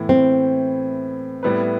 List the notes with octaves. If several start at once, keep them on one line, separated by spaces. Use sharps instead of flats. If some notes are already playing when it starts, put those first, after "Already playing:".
Already playing: A2 E3 B3 E4
C4
A2 G3 B3 E4 B4